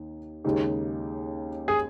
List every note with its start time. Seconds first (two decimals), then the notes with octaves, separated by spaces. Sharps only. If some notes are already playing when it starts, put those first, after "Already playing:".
Already playing: D#2 D#3 D#4
0.44 D#2 C#3 G#3 D#4 G4
1.68 G#4